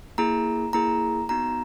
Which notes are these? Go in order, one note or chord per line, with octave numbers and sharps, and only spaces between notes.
A#3 E4 G#4 A#5
A#3 E4 G#4 A#5
B3 D#4 F#4 A#5